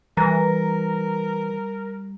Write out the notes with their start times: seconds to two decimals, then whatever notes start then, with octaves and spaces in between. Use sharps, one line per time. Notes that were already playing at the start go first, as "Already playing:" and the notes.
0.17 E3 G3 A#4 A#5 A#6